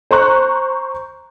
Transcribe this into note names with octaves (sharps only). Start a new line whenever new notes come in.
C5 A#5 C#6 F#6